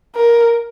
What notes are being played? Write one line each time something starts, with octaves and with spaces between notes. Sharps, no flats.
A#4